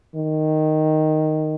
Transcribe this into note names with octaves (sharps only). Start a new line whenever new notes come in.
D#3